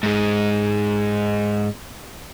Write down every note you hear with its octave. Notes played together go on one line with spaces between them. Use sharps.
G#2 G#3